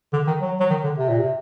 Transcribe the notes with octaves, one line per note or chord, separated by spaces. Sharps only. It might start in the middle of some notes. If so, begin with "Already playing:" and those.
D3
D#3
F#3
F#3
D#3
D3
C3
A#2
C3